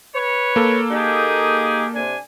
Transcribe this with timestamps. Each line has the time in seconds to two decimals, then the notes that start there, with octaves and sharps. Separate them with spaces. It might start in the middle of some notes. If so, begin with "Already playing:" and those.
0.15 B4 C#5
0.56 A#3 A4
0.91 D#4 G4 G#4
1.95 C3 D4 G#5